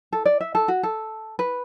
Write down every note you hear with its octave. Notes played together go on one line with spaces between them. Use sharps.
A4
D5
E5
A4
F#4
A4
B4